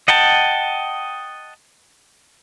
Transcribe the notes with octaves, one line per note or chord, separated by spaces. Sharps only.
D#5 F#5 G5 A5